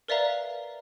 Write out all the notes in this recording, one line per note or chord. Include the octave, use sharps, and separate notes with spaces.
A#4 B4 D5 E5 F5 A#5